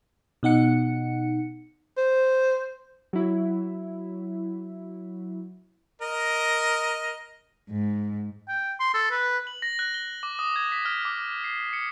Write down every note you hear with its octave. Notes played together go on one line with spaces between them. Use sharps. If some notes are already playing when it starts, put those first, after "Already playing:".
B2 D#4 F#5 C#7
C5
F#3 E4
A#4 D#5
G#2
G5
C6
A4
B4
F#7
A#6
F#6
G7
D6
D#6
G#6
B6
F6
D6
C7
C#7